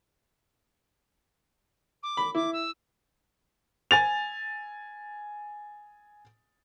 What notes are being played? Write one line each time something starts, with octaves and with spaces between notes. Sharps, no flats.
D6
B5
E4 D6
E6
G#5 A6 F7